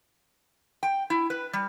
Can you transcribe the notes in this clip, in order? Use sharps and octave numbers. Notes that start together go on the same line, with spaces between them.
G5
E4
B4
G3